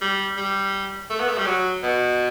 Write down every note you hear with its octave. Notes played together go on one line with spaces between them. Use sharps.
G3
G3
A3
B3
A3
G3
F#3
B2